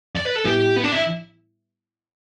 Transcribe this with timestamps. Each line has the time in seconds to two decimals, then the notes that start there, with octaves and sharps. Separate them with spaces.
0.16 D5
0.25 B4
0.35 A4
0.44 A2 G3 B3 E4 G4
0.77 B3
0.84 D4
0.93 E4